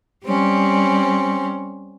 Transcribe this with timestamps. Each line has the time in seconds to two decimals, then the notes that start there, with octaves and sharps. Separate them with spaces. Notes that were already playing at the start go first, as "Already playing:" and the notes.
0.24 G3 C4 C#4